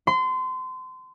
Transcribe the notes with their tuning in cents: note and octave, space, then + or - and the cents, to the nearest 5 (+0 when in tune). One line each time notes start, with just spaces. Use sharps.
C6 -30